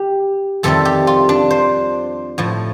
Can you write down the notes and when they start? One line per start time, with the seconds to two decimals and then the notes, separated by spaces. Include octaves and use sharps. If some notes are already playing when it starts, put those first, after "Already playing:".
Already playing: G4
0.63 F2 C3 D#3 G3 A4
0.85 G4
1.07 F4
1.29 D4
1.50 C5
2.38 A2 F3